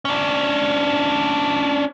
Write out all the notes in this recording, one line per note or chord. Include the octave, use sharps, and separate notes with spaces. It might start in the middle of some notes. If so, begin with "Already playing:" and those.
C#4 D4